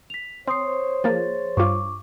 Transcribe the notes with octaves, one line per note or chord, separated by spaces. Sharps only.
B6 F7
C4 C5 C#5 C6 D#6 C7
F3 A#3 G#4 A6
G2 F4 C#6 D6